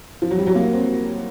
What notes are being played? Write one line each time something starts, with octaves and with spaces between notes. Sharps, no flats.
F3
F#3
G3
F#3
A#3
C4